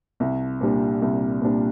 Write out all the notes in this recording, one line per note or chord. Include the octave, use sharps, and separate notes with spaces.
C2
A#2 G3 D4
C2
A#2 G3 D4